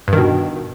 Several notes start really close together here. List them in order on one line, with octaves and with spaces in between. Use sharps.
G2 D#3 B2